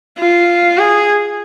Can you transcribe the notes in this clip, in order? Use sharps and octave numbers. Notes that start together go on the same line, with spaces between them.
F4
G#4